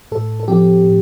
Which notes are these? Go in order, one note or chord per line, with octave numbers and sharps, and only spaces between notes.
A2 A4
A4
F3 C4 G4
A2